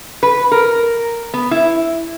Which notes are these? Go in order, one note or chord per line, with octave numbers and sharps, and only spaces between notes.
B4
A#4
B3
E4